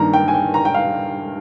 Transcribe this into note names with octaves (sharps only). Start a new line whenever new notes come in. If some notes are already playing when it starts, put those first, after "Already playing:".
Already playing: G2 D#3 A#3 A#5
G5
G#5
G5
A#5
G5
F5